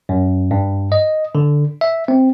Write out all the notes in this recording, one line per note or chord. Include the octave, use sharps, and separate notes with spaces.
F#2
G2
D#5
D3
E5
C4